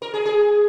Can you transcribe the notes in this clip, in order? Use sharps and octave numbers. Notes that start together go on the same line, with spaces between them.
A#4
G#4
G#4